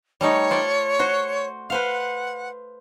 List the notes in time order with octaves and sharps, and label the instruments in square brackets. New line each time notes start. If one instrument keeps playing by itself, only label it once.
[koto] G3 A3 D#4 [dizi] C#5
[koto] F4 C5 D5
F#4 C5
[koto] B4 C5 F5 [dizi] F#5